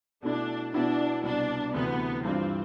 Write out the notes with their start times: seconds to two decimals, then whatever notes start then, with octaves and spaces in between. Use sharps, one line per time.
0.23 B2 A3 D4 E4
0.73 B2 B3 D4 E4
1.23 C2 B2 B3 D4
1.74 D2 C3 E3 A3 B3 D4
2.24 G2 E3 G3 C4 D4 F4